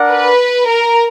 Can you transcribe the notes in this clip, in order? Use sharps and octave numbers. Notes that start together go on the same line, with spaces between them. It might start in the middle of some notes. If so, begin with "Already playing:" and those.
Already playing: D4 A#4 D5 F#5
B4
A#4